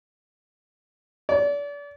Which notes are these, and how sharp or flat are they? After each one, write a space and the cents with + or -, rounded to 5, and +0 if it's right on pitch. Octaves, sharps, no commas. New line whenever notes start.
D5 -35